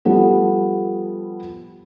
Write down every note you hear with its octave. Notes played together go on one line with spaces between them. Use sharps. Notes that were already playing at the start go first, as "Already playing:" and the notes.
F3 G3 B3 A4